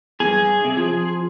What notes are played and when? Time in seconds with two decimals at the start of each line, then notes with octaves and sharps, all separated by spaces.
0.20 E2 G2 G#4
0.64 C3
0.77 F3